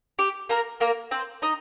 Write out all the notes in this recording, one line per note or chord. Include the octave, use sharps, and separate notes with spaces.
G4
A#3 A#4
A#3 A#4
C4 C5
D#4 D#5